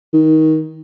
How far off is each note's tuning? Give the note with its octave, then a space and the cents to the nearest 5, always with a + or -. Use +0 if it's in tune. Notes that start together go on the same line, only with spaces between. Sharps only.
D#3 +20